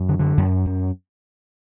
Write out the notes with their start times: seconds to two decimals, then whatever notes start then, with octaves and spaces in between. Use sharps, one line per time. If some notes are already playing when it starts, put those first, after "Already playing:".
Already playing: F#2
0.09 D3
0.19 D3
0.38 F#2
0.66 F#2